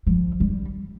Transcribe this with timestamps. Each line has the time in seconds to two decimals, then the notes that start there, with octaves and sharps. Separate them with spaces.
0.07 F3
0.40 G3